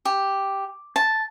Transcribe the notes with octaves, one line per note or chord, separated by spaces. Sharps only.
G4
A5